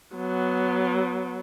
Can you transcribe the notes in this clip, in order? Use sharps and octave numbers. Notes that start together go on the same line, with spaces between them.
F#3 B3